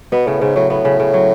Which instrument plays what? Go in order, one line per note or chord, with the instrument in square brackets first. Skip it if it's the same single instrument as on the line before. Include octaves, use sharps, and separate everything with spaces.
[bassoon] B2 [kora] B3
[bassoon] A2 [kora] C#3
[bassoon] G#2 [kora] C#3
[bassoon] A2 [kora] F#3
[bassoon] A2 [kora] B3
[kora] C#3
C#3
F#3